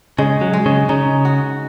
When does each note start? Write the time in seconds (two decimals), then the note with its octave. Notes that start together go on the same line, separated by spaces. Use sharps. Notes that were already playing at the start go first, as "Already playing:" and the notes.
0.18 C#3 G#3
0.41 F#3
0.53 G#3
0.66 C#3
0.89 C#3 D#4
1.25 F#4